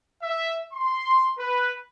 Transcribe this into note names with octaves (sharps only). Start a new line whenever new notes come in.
E5
C6
B4